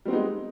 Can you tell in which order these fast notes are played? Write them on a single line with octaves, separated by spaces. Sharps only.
G3 C4 B3 D#4 G#3